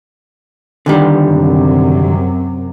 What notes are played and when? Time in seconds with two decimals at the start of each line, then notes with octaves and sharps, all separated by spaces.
0.86 D3 D#3 G3
1.26 F#2 C3